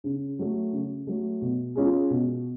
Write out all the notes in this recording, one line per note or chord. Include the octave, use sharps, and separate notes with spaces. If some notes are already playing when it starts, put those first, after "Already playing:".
C#3
F#3 A3
C#3
F#3 A3
B2
G#3 C#4 F4
B2